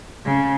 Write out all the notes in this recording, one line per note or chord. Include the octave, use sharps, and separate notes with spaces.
C#3